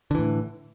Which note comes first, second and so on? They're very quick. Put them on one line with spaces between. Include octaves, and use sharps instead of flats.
D3 E3 A2